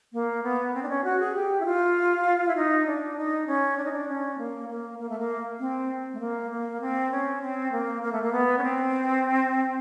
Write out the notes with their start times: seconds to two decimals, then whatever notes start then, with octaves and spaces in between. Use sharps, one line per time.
0.13 A#3
0.43 B3
0.74 C4
0.83 D4
0.89 C#4
1.04 F#4
1.20 G#4
1.35 G4
1.60 E4
1.65 F4
2.48 E4
2.56 D#4
2.87 D4
3.17 D#4
3.47 C#4
3.77 D4
3.84 D#4
3.93 D4
4.08 C#4
4.38 A#3
4.69 A#3
4.99 A#3
5.09 A3
5.19 A#3
5.59 C4
6.13 A3
6.20 A#3
6.51 A#3
6.81 C4
7.11 C#4
7.42 C4
7.72 A#3
8.03 A#3
8.12 A3
8.22 A#3
8.32 B3
8.58 C#4
8.63 C4